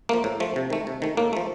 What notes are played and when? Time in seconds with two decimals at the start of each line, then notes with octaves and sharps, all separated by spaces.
0.09 F3 A3 A#3
0.24 A2
0.40 F3 A3
0.56 C3
0.70 D#3 A3
0.87 C3
1.02 D#3 A3
1.17 A2 A#3
1.33 F3 A3